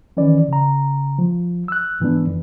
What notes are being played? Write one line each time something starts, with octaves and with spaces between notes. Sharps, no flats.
D#3 E3 C#4 D5
C#3 A#5
F3
E6 F#6
G#2 E3 B3 D4
F2 E3